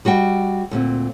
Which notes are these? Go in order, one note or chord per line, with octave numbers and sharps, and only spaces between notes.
G3 F#4 D#5 G5
D2 A#2 C4